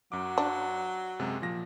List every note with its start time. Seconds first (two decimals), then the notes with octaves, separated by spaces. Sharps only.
0.12 F#2 F#3 D6
0.38 D4
1.19 F#2 C3 G#3
1.42 A#2 F3 A#6